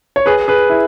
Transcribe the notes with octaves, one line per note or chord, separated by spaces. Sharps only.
C#5
G#4 B4
G#4 B4
E4